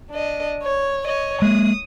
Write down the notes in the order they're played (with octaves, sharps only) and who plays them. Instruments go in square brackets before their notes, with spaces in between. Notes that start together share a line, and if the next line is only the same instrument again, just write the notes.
[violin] D4 D#5
C#5
C#5 D#5
[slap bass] G#3 A#3 [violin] D#6